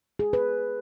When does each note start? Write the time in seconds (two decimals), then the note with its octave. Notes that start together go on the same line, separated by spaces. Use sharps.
0.19 G#4
0.33 B4